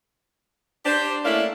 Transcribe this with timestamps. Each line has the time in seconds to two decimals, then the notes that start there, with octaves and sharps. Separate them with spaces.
0.86 D4 G4 C5
1.25 A3 A#3 C#4 D4 E4 F5